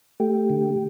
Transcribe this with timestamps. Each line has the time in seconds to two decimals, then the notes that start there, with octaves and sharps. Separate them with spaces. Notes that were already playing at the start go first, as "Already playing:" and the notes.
0.20 A3 G4
0.50 D3